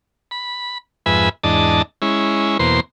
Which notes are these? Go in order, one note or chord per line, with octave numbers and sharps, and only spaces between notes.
B5
F2 G#2 B4 E5 G#5 B5
E2 G#2 D4 D#5 A5
G#3 C#4 E4
E2 B2 A#3 C5 C6